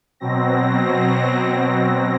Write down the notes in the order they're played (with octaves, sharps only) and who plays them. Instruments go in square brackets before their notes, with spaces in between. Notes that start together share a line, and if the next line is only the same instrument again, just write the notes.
[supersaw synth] B2 F#3 C4 A#6